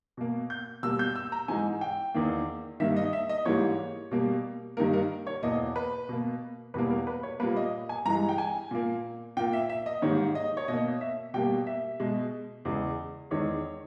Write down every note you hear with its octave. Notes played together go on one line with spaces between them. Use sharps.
B2 A#3
G6
B2 G3 A#3 E6
G6
E6
A#5
G#2 E3 G#3 G#5
G5
E2 D#3 A#3
G2 D#3 A#3 E5
D#5
E5
D#5
G#2 E3 G3 A#3 C#5
B2 G3 A#3
G2 D#3 G3 A#3 A#4
A#4
C#5
E2 B2 A#3 D#5
B4
B2 A#3
E2 B2 G3 A#3 B4
A#4
B4
C#5
A#2 G3 A#3 B4
D#5
G#5
G2 E3 G#3 A#5
G5
G#5
A#2 A#3
A#2 A#3 G5
E5
E5
D#5
G#2 D#3 G3 A#3 C#5
D#5
C#5
B2 A#3 D#5
E5
B2 G3 A#3 G5
E5
B2 G#3
E2 C#3 G#3
E2 D#3 G#3 C#5